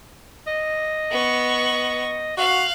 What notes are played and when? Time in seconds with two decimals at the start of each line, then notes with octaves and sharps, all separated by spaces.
0.47 D#5
1.11 B3 C#6
2.37 F#4 F5 F#6